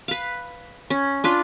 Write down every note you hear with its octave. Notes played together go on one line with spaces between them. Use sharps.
B4 F5
C#4
D4 F4 B4